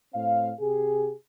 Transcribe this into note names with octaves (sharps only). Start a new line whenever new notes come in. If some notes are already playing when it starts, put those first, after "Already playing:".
A2 C4 F5
C3 G4 G#4